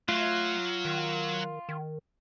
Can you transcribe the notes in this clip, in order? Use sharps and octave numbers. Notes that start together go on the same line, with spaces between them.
F#3 A3 F4
D#3
D#3